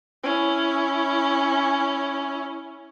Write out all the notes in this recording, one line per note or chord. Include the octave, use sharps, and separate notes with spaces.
C#4 E4